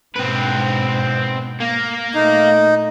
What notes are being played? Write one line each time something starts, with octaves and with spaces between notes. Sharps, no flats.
G#2 B2 C4 B4
A#3
A#2 A3 D#4